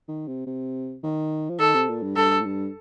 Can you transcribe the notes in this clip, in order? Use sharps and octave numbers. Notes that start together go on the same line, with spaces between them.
D#3
C3
C3
D#3
F3
D#3 A4
C3
A#2
G2
G2 A4
A2
G2